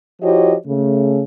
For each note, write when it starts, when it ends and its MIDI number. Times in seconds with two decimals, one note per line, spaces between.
0.22 0.54 53
0.22 0.54 64
0.22 0.54 66
0.22 0.54 67
0.22 0.54 73
0.22 0.54 75
0.66 1.22 49
0.66 1.22 57